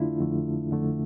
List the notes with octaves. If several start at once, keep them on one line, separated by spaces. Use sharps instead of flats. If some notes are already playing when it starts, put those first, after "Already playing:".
Already playing: F2 D3 A3 D4 E4 F4
F2 D3 A3
F2 D3 A3